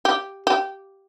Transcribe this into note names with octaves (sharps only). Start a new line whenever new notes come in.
G4
G4